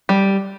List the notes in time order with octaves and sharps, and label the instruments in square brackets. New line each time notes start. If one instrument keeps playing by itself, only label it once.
[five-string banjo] G3